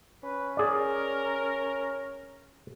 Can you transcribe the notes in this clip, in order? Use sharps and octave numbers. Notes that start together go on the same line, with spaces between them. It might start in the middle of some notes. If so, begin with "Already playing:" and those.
C#4 B4
G#4 A#4 D5